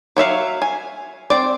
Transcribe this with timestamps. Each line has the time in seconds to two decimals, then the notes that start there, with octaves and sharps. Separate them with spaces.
0.17 F#3 C#5 E5 F5
0.62 G#5
1.30 C4 D5